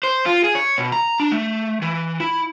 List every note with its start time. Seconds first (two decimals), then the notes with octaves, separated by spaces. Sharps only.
0.03 C5
0.26 F4
0.44 G#4
0.55 C#5
0.78 B2
0.92 A#5
1.20 D4
1.32 A3
1.82 E3
2.20 E4